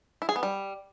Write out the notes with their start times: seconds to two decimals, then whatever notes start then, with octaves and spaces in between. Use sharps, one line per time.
0.22 E4
0.29 G#4
0.36 B3
0.43 G3